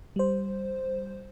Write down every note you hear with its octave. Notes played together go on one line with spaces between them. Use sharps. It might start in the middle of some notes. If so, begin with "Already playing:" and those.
G3 C5